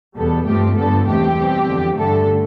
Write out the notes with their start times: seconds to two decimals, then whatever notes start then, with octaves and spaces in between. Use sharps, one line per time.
0.16 E2 B2 G3 B3 A4
0.45 G2 F3 A3 C4 G4
0.76 G2 D3 F3 B3 A4
1.06 E2 B2 A3 C4 G4
1.36 B2 G3 C4
1.67 E2 D3 F3
1.96 G2 D3 A3 A4